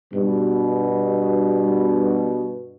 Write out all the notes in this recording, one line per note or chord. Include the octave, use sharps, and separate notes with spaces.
G2 B2